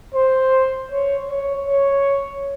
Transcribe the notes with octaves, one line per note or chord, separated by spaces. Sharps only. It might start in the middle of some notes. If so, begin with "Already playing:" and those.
C5
C#5
C#5
C#5